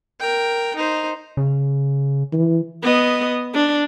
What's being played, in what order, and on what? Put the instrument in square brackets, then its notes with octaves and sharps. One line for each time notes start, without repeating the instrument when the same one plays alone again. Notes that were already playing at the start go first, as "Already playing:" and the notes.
[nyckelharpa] A#4 G5
D#4 C5
[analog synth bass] C#3
[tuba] E3
[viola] B3 D#5
D4